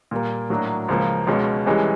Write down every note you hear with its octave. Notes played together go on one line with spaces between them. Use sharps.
A#2 G3 A#3
A2 F#3 A#3 D4 F#4
C#2 C#3 F3 A#3
C#2 B2 G#3 C#4
C2 C3 E3 G#3 C#4